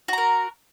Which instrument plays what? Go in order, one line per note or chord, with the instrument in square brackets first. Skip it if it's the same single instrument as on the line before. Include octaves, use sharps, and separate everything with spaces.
[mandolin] F#4
A#5
A#4